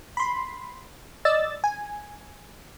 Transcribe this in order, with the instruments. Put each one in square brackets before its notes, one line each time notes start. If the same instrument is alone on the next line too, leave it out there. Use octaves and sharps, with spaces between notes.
[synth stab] B5 C6
D5 D#5 E6 A6
G#5